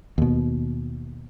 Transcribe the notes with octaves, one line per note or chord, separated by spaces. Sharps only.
D#2 B2